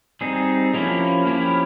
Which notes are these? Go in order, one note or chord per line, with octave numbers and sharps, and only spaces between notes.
G3 C4 D#4 G#4
F3 A#3 C#4 E4 G4
F3 A#3 C#4 E4 G4